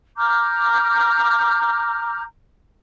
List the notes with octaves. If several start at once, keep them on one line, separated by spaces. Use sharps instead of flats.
A#5 D6 F6 G6